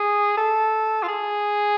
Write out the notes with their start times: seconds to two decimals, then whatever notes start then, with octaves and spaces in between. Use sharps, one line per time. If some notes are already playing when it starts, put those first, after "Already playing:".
Already playing: G#4
0.37 A4
1.03 F4
1.08 G#4